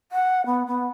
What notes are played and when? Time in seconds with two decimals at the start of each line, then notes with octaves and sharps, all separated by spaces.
0.12 F#5
0.46 B3
0.67 B3